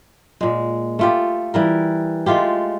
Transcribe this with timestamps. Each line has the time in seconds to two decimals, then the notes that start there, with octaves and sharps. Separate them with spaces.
0.41 A#2 G#3
0.99 A3 F4 G4
1.54 E3 G3 A#4
2.26 G#3 A3 F4 G4